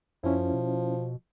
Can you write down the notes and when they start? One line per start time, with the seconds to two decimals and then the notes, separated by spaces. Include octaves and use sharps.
0.24 F#2 F3 C#4 E4
0.53 B2